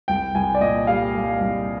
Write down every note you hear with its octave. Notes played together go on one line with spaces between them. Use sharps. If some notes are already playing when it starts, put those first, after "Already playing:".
C2 G5
C2 G#5
D5
A#2 D#5
G3 F5
G3
C2